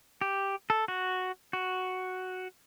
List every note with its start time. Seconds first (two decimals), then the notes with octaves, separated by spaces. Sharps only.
0.21 G4
0.70 A4
0.88 F#4
1.53 F#4